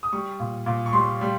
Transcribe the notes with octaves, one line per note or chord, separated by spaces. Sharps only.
D#6
G3 C#6
A#2
A#2
C#6
G3 C6
G3